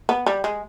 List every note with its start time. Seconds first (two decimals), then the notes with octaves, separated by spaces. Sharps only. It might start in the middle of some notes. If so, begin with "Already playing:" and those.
0.09 B3
0.26 G3
0.44 G#3